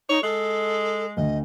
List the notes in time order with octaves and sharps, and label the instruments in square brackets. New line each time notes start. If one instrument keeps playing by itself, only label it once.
[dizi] D#4 [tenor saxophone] C#5
[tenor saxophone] G#3 [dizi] A4
[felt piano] D2 [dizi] D#5